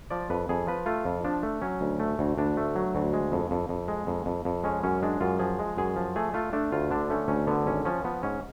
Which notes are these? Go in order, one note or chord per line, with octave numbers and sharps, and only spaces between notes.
F3 D5
F2 B4
F2 G#4
F3 B4
A3 F4
F2
F3 D4
A3
F#3 C#4
D2
A3
D2
D2 D4
A3
F#3
D2
G#3
F2
F2
F2
G#3
F2
F2
F2
G#3 C#4
F#2 C#4
G#3 D4
F#2 F4
F3 G#4
G#3
F#2 G#4
F3
A3 G#4
A3 F4
A3 D4
D2 F4
D3 D4
A3 C#4
D2 C#4
D3 B3
G#1 C#4
F3 C#4
F3 B3
G#2 C#4